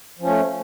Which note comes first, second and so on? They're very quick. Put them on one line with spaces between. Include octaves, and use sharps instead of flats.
F3 C#4 A3